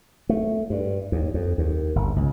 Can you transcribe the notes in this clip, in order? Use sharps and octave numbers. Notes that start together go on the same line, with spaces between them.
A3
G2
D#2
F2
D#2
G1
C#2